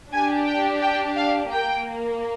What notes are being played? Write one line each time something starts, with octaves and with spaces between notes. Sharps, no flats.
D4 G4 G#5
G5
G5
F5
A#3 G5